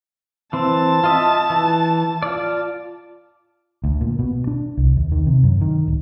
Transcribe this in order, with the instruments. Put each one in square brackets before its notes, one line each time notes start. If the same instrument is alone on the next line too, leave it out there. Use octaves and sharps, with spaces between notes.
[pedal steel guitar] E3 C4 [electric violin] A5
[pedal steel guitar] F4 D#5 E5
E3
F4 D5
[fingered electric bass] D2
A#2
B2
D4
C2
D#2
D#3
C3
F#2
D#3
D1